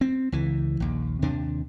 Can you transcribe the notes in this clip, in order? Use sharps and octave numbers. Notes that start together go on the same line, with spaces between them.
C4
C#2 E3
A#1 D#2
D#2 C3 D4